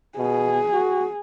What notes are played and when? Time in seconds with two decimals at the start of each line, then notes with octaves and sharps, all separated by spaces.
0.18 B2 G#4
0.73 F#4